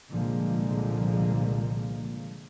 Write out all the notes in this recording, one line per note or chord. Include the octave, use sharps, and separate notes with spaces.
C2 A#2 D3 F3 G#3 A#3